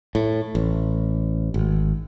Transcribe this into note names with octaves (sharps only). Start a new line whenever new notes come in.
A2
A1
G#1